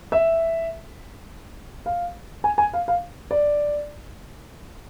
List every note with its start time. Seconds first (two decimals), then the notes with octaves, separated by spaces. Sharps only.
0.12 E5
1.86 F5
2.44 G#5
2.58 G#5
2.73 F5
2.88 F5
3.31 D5